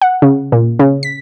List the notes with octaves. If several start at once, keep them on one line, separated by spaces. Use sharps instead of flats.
F#5
C#3
A#2
C#3
B6